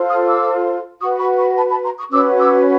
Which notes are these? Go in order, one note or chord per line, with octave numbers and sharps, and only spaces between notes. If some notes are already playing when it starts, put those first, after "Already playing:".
Already playing: F4 A4 C5
D#6 F6
D6 E6
F#4 B4 C#6 D#6
B5 C#6
B5 C#6
A5 B5
A5 B5
A#5 C6
C#6 D#6
C#4 F#4 B4 D6 E6
D6 E6